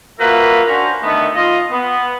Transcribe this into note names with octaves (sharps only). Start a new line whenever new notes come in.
A#3 F4 F#4 A#4 B4 E5
C#4 D4 F#4 A#4 C5
D3 D#3 A3 B3
F4 D#5
B3